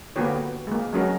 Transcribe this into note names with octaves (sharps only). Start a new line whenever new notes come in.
D3 A#3 B3 F#4 G4 C#5
G#3 A#3
F#3 G#3 C#4 F#4 A#4